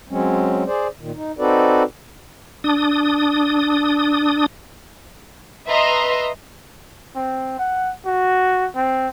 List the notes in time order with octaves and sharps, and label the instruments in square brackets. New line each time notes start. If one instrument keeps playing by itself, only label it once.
[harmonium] F#3 G#3 C4 C#4
G#4 C5 D5
A#2 D#3
D#4
C4 D#4 F#4 A4 B4 D5
[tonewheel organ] D4 D#6
[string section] B4 D#5 E5 A#5 C6
[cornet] C4
F#5
F#4
C4